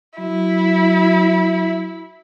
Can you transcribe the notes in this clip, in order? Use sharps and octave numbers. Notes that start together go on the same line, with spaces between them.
F#3 E4